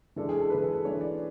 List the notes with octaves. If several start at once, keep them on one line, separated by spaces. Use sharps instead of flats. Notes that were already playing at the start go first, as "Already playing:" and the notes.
E3 G#3 D4 A4
G#4
A4
E3 G#3 D4 B4
A4
A4
E3 G#3 D4 C#5
D5